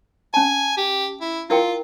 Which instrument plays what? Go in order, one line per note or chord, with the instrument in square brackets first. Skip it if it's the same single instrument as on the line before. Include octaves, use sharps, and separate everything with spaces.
[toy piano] C#4 A5 [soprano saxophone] G#5
[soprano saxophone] G4
E4
[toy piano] E4 A#4 G5 [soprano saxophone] F4